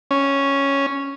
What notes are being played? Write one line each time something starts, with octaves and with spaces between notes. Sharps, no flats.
C#4